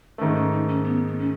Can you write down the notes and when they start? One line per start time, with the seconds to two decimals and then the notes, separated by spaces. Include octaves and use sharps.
0.18 G#2 D#3 A3 C#4
0.35 C#4
0.52 D#4
0.68 C#4
0.84 B3
1.07 B3
1.19 C#4